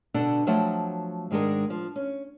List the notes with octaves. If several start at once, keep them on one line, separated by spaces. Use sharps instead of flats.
B2 D3 D4 A4 D5 F#5
F3 F#3 A3 F#5 G5 A5
G#2 D#3 G#3 D4 A#4
F3
C#4